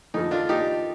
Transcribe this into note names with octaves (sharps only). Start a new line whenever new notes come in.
F2 D3 F3 D#4
D4 F4
D#4 G4